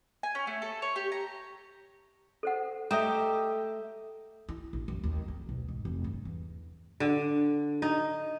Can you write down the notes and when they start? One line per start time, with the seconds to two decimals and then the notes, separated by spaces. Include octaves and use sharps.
0.23 G#5
0.35 C#4
0.47 A3
0.62 A4
0.82 C#5
0.96 G4
1.12 A#5
2.43 A4 C5 F#5
2.91 A3 G4 D#5 E5 A#5
4.49 E4
4.73 A#1
4.88 F#2
5.04 D#2
5.28 F2
5.49 B1
5.68 G#2
5.85 F1
6.04 G2
6.25 E2
7.00 D3
7.82 D#4